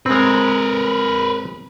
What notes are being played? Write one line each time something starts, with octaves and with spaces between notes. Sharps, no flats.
G#3 C4 A#4 B4